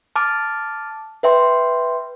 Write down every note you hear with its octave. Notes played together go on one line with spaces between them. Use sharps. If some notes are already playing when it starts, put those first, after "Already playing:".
A5 D6 F6
B4 E5 G5 C6